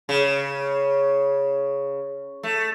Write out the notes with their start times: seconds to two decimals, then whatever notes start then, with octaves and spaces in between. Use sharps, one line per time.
0.09 C#3
2.43 A3